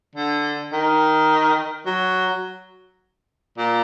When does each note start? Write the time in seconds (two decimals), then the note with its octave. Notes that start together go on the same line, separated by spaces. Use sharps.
0.15 D3
0.73 D#3
1.86 F#3
3.58 A#2